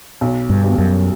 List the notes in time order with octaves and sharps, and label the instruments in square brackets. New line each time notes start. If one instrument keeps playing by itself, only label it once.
[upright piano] B1
[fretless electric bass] G2
[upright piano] B2 G3
[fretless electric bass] F#2